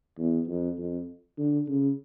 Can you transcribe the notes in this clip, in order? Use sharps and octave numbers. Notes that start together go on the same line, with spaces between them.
E2
F2
F2
D3
C#3